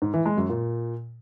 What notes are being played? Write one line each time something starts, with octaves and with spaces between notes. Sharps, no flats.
G#2
E3
G#3
F#2
A#2